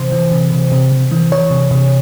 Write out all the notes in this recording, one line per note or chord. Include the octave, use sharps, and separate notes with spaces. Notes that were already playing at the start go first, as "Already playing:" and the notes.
Already playing: C3 E3 C5
E3
C3
C3
C3
C3
E3
E3 C#5
C3
C3